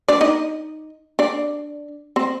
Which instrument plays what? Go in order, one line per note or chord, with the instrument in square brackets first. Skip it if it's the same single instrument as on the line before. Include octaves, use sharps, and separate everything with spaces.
[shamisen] D4 D5
D#4 D#5
D4 D5
C4 C5